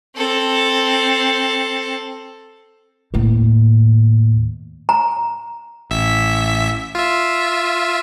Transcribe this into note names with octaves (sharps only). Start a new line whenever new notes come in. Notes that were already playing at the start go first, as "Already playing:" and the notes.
C4 A4
D#2 A2
A#5
A1 E5 B6
F4 E5